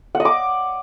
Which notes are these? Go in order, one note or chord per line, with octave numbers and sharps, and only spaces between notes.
F#5
D#5
D6